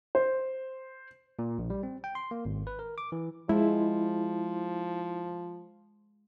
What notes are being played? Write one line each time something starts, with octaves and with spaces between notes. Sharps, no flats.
C5
A#2
A#1
G3
C4
G5
C6
A#3
G#1
B4
A#4
D6
E3
F3 G#3 E4